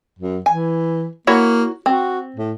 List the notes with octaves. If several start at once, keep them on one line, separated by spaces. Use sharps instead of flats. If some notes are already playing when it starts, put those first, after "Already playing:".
F#2
E3 G#5
A#3 E4 F#4 C#5
C4 F#4
A2